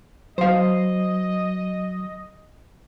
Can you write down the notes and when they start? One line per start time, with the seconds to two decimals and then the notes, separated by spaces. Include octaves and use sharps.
0.38 F#3 C5 D#5 F5